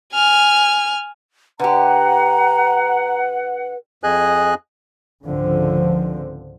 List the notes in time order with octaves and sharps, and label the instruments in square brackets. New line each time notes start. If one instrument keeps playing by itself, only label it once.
[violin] G#5 F6
[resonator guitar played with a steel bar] D3 G4 [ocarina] B4 [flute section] F#5 [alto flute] A#5
[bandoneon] F2 G#4 D#5 G#5 F#6
[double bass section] C#2 G#2 D3 F3 C4